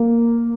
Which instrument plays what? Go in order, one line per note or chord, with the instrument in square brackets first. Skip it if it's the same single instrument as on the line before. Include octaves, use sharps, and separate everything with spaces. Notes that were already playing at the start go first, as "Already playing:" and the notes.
Already playing: [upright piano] A#3